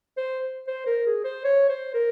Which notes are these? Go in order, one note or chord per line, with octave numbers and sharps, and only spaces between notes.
C5
C5
A#4
G#4
C5
C#5
C5
A#4